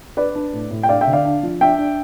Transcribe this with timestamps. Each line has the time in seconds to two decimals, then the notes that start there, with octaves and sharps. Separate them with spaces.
0.17 D4 B4 D5
0.35 D4
0.53 A2
0.71 A2
0.83 G5
0.89 D4 D5 F5
1.01 E5 G5
1.07 D3
1.13 D5 F5
1.25 D4
1.43 F3
1.61 D4 E5 G5
1.79 D4